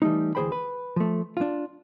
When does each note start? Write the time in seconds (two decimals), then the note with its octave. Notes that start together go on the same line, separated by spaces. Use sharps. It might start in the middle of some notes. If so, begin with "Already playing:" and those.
0.02 E3 G3 A3 D#4
0.35 D2 E3 G#4 C5 G5 B5
0.52 B4
0.96 F3 A3
1.37 D4 F4